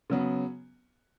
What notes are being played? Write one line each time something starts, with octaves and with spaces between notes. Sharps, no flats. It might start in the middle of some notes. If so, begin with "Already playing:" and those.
C#3 F#3 B3